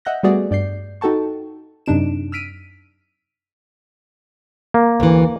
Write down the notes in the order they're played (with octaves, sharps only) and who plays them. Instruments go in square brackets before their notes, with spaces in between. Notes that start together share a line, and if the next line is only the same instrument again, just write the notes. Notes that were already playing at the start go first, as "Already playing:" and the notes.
[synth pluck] D#5 E5 F#5 F#6 G6 A#6
G3 A3 B3 F#4 G#4 D5
G2 D5 G6 C7
D#4 F#4 A4 G5 A5 C#6
F#2 C3 D4 D#4 D7 E7
E6 F6 B6 D7 D#7
[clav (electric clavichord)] A#3
[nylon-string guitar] D2 E3